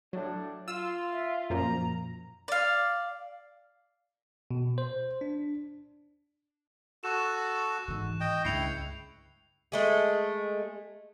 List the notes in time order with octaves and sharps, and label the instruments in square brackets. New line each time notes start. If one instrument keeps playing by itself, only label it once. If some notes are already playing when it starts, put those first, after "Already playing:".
[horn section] A2 D4 [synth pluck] F#3
[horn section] F4 [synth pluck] E6
[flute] E5
[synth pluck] F#2 A#2 F3 [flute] A#5
[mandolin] D5 F5
[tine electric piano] B2
C5
D4
[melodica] F#4 A4 [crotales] C#6 F#6 E7
[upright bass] G#2 E3
[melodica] D#5 G5
[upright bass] C#2 G2 [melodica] E4 G5 [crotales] C7 C#7 F7
[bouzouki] G#3 A3 G#4